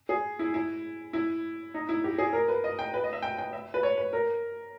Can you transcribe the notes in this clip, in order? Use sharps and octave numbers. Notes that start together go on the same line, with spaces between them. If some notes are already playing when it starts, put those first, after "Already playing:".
G#4
E4
E4
E4
D#4
E4
G4
G#4
A#4
B4
D#5
G5
B4
D#5
E5
G5
G5
E5
B4
C#5
B4
A#4